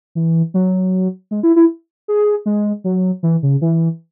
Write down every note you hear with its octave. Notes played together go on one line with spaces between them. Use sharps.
E3
F#3
G#3
E4
E4
G#4
G#3
F#3
E3
C#3
E3